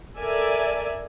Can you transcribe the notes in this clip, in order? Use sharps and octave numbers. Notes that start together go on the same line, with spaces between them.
A4 A#4 D5 E5 G#5